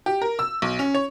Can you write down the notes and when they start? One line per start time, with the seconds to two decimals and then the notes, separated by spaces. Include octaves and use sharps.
0.06 G4
0.22 A#4
0.39 E6
0.62 B1
0.79 C#4
0.95 C#5